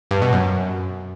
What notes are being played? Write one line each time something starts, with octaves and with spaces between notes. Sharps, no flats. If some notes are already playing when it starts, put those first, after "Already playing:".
G2
B2
F#2